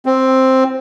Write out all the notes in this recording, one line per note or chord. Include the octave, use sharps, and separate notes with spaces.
C4